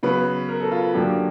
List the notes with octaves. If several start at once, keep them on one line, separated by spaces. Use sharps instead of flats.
C#3 F#3 B3 B4
A#4
A4
F4
F#2 D3 F#3 A#3 G4